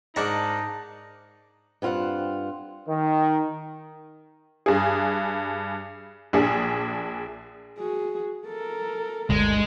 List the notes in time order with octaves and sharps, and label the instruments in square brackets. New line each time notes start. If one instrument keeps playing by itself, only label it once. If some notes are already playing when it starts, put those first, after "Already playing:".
[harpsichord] G#2 D4 [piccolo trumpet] D#4 [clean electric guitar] A#4 F#5 A#5 [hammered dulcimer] A5 D6
[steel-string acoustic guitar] G2 C4 F4 A4 F#5
[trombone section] D#3
[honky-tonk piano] G2 G#4
A#1 D4 G#4
[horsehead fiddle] F#4 G#4
A4 A#4
[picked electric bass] G1 D2 [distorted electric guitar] G#3